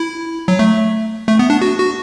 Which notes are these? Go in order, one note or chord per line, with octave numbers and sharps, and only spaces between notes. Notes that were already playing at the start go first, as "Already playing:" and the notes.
Already playing: E4
F#3
A3
A3
B3
D4
F#4
F#4